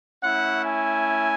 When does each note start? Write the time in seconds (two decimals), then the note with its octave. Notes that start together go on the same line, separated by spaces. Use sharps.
0.23 A3 C#4 E4 F#5
0.65 G#5